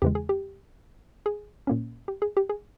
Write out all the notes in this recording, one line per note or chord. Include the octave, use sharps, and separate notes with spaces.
E2 C#3 E3 G#3 G4
G#4
G4
G#4
A#2 A#3 C#4
G4
G#4
G4
G#4